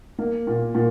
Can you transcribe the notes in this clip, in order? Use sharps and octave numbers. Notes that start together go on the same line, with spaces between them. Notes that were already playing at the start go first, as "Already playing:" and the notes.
A#3
A#2
A#2